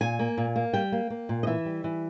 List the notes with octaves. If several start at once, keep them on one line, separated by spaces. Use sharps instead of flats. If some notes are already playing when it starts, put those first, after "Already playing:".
A#2 G#5
A#3
A#2
A#3
G3 G5
A#3
A#3
A#2
D#5
E3 E5
G3
E3